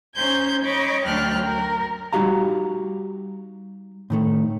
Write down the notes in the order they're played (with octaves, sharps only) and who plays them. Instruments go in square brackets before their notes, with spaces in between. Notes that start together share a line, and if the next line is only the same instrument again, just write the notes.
[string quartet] C#4 D#4 C5 G6 G#6
C#5 D#5 B5 C#6 D6
D2 F#3 D4 G5 F6 F#6
A#4
[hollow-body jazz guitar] G3 D#4 F#4 G4 F5 A#5
A2 D#3 A3